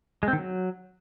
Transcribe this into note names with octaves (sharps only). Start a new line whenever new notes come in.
G#3
C4
D#3
F#3